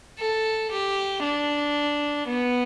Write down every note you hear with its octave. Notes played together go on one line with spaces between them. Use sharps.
A4
G4
D4
B3